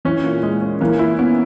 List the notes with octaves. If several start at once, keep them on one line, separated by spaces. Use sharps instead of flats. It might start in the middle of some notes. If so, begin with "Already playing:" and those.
E3 C#4
A#2
G#3
C#4
E3 A#3
E4
B3 C#4